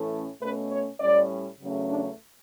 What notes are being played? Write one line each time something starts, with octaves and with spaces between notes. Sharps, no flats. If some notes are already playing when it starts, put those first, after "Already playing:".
Already playing: A2 E3 A3 C#4
B2 A3 C#4 B4
C#5
A2 G3 C#4 D5
E2 C#3 F#3 A3 C#4
D4